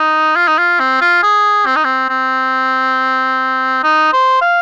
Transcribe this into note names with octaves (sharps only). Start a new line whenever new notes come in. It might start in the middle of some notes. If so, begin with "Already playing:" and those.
Already playing: D#4
F4
D#4
F4
C4
F4
G#4
C4
D#4
C4
C4
D#4
C5
F5